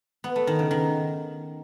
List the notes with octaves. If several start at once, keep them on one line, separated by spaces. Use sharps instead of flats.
B3
A3
D#3
C#3
D#3